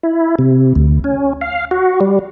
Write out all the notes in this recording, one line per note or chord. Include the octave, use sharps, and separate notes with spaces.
E4
C3
D2
C#4
F5
F#4
G3